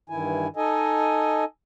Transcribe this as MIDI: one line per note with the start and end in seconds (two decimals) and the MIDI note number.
0.09 0.48 43
0.09 0.48 51
0.09 0.48 52
0.09 0.48 64
0.09 0.48 80
0.56 1.44 63
0.56 1.44 69
0.56 1.44 75
0.56 1.44 80